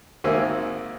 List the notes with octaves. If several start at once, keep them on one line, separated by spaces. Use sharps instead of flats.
G#1 D#3 A#3 C4 E5 G#5